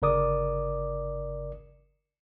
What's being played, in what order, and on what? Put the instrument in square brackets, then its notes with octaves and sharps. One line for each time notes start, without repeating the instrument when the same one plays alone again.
[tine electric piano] G1 C#3 A#4 D5 D6 D#6